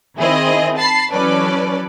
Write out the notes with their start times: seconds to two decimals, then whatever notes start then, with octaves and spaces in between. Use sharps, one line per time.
0.19 D#3 C4 E4 G#4 D#5
0.77 A5 B5 A6 C7
1.10 E3 F#3 C#4 A4 B4 D5